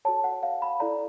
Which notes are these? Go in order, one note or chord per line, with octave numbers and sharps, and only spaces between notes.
F#4 A4 C#5 A5
F#5
F5
B5
E4 A4 D5 A#5